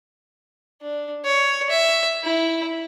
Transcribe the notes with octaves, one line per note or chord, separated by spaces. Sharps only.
D4
C#5
E5
E4